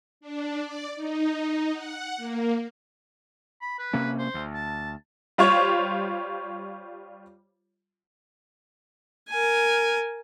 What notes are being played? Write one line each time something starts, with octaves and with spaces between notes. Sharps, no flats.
D4
D5
D#4
F#5
A#3
B5
B4
C3 A#3 C#4
C5
D2
A5
G3 F4 C5 C#5
A#4 G#5